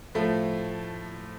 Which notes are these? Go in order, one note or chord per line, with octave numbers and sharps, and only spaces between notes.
A2 F3 A3